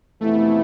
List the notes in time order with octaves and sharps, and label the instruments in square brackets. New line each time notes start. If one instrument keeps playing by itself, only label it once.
[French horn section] F2 C3 E3 B3 E4 [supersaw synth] A3